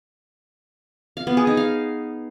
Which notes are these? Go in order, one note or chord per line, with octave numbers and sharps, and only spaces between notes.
F5
B3
G#4
D#4
F5